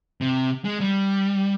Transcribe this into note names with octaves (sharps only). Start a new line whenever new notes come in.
C3
G#3
G3